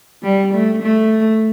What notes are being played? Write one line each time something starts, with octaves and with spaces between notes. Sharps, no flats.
G3
A3
A3